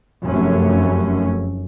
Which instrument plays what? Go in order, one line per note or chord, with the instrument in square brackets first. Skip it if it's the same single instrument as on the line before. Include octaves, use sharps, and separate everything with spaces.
[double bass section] F1 F#2 A3 C#4